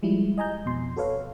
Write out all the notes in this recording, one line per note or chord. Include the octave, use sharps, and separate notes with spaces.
F3 G3 G#3 E4
D#5 G#5 A#5 G6
F2 B2 C6
F#4 A4 B4 C#5 F5